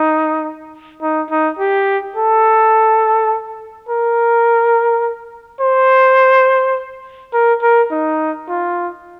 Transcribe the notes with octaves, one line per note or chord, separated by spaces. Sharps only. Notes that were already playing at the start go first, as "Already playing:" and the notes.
Already playing: D#4
D#4
D#4
G4
A4
A#4
C5
A#4
A#4
D#4
F4